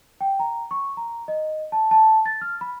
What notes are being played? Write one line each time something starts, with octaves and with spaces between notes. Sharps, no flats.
G5
A#5
C#6
A#5
D#5
A5
A5
A6
F6
B5